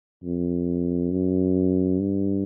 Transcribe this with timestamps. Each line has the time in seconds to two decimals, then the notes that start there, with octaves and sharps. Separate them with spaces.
0.23 F2
1.11 F#2
1.99 G2